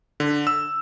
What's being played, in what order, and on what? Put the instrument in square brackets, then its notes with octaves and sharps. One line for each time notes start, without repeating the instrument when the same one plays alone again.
[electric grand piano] D3
E6